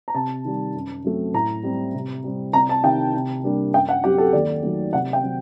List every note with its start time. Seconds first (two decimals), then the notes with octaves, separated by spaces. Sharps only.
0.08 A#5
0.15 C3 A5
0.45 D#3 G3
0.74 F#2
1.04 F#3 A3 C4
1.34 A2 A#5
1.63 G3 C4
1.94 C3
2.24 G3 C4
2.53 C2 A#5
2.69 A5
2.83 C3 D#3 G5
3.14 C3
3.44 G3 A#3 D4
3.74 F#2 G5
3.89 F#5
4.04 F#3 C4 G4
4.18 A4
4.33 D#2 D5
4.63 D#3 F#3 A3
4.93 C3 F#5
5.13 G5
5.23 F#3 C4